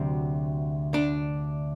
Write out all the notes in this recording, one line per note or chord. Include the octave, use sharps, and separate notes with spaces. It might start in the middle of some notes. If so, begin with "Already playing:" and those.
Already playing: D2 C3 F#3 C4
D4